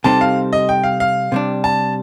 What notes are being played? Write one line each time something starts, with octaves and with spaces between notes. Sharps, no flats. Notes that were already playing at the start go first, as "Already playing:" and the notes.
C3 G3 C4 D#4 A4 A5
F5
D#5
G5
F5
F5
C3 G3 D4
A5